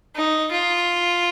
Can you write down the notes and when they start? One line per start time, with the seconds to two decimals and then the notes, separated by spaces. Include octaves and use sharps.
0.16 D#4
0.51 F4